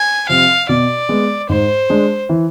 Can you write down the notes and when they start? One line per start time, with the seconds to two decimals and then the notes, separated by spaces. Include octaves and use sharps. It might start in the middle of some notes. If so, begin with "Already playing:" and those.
Already playing: G#5
0.29 C3 F3 F5
0.69 B2 D5
1.09 G#3 B3
1.49 G#2 C5
1.90 G#3 D4
2.29 E3